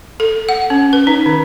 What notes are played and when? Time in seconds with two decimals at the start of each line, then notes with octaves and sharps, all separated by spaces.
0.20 A4
0.49 F#5
0.70 C#4
0.93 B4
1.07 D#4
1.26 D#3